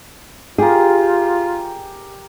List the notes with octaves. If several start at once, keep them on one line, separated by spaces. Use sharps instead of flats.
F4 G4 G#4 A#4